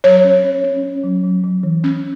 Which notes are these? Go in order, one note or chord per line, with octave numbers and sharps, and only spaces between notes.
F#3 C#5
C#4
C#4
C#4
C#4
F#3
F#3
F#3
E3
C#4